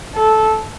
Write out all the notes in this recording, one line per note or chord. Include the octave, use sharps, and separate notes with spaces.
A4